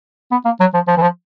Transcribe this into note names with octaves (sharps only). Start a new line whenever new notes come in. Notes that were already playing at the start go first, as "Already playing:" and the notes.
B3
A#3
F#3
F3
F3
E3
F3